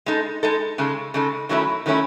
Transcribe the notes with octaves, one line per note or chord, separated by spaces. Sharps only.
G#3 D#4 A4
G#3 D#4 A4
C#3 G#3 D#4 A4
C#3 G#3 D#4 A4
D#3 F#3 A3 C#4 E4
D#3 F#3 A3 C#4 E4